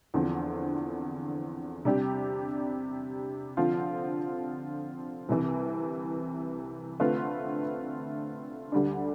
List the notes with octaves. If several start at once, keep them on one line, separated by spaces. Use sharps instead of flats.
E2 D3 F3 C4
C3 G3 D4 G4
D3 F3 C4 F4
C2 C3 E3
D3 A3 C4 F4 B4
D2 D3 G3 D4